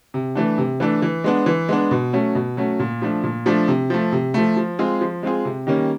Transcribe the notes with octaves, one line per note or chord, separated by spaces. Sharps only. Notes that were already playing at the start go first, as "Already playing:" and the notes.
C3
E3 A3 D4
C3
E3 A3 D4
E3
G#3 B3 D4
E3
G#3 B3 D4
B2
F#3 A3 C#4
B2
F#3 A3 C#4
A#2
F3 A3 D4
A#2
F3 A3 D4
C3
F3 A3
C3
F3 A3
F3
G#3 C4 F4 G#4
F3
G#3 C4 F4 G#4
C3
D#3 G3 A#3 C#4